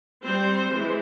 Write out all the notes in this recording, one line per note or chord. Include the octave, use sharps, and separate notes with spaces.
G3 C4 C5
E3 G#3